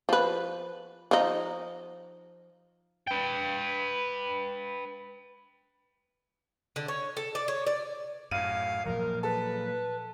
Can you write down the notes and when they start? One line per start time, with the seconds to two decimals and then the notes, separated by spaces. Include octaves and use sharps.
0.09 F3 B4
1.11 F3 D#4
3.07 B4 G5
6.76 D3
6.88 C#5
7.17 A4
7.35 D5
7.48 C#5
7.67 D5
8.31 F#2 A2 F5 D#7
8.85 A#2 F3 F#3 A#4
9.23 A4 B4